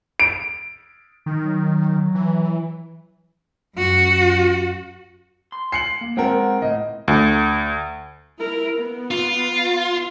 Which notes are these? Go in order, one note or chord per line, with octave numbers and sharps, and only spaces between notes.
D7
D#3
F#3
E3
F#2 F#4
C6
C7 C#7 F#7
A#3
G#3 C4 A#4 F#5 G5
C#2 A2 D#5
D2
E4 A#4
B3
F4